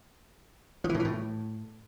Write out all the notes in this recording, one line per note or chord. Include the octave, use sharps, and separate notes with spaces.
F3
E3
A2
E3
A2